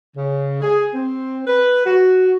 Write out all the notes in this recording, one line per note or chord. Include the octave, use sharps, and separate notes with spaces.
C#3
G#4
C4
B4
F#4